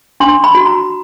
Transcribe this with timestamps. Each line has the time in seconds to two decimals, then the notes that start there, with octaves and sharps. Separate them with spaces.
0.20 D4 C6
0.44 B5
0.55 F#4
0.66 A#5